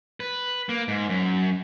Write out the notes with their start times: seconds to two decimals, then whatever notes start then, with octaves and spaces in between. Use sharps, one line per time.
0.20 B4
0.69 A#3
0.88 G#2
1.09 F#2